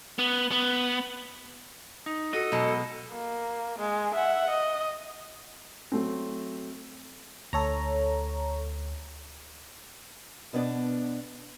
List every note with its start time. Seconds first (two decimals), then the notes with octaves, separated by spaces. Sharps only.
0.19 B3
0.51 B3
2.06 D#4
2.33 F#4 A4 D#5
2.52 B2 F#3 G#3
3.12 A#3
3.78 G#3
4.14 E5 F#5
4.50 D#5
5.92 F#3 A3 C4
7.53 D2 A4 C#5 A#5
10.53 B2 B3 D4 D5